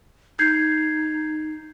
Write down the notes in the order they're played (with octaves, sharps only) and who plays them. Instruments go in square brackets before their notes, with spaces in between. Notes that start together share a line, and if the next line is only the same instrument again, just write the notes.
[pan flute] D#4 [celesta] G6 G#6 C7